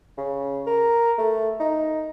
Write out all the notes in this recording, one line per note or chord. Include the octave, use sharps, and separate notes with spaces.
C#3
A#4
A3
D#4